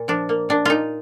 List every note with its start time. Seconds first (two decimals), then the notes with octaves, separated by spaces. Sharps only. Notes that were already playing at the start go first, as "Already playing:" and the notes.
Already playing: A#2
0.08 F3 D4
0.29 A#3
0.49 A#2 D4
0.65 A#2 D#4 F4